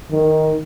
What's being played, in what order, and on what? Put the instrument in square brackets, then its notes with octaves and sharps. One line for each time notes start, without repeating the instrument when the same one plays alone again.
[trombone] D#3